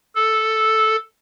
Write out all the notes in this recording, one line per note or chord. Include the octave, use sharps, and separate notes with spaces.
A4